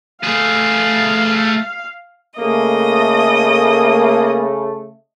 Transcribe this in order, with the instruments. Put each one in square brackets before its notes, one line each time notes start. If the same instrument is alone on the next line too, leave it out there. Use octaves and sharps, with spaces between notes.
[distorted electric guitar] A3 G#4 [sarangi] F5
[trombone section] C#3 A3 [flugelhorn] A#3 [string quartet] D#5 D#6